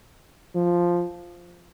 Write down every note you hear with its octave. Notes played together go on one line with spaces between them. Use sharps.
F3